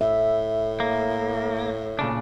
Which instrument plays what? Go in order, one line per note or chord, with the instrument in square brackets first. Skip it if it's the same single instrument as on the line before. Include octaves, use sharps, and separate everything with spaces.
[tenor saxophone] A2 [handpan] E5
[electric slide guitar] A#3
A#2 C#3 D4